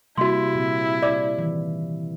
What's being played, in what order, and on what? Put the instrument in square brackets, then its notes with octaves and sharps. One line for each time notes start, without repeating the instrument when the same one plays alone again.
[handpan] C3 G3 A#3 [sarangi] E4 [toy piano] F#4 C6
[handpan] A#2 C4
[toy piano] D5 D6
[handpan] D#3 E3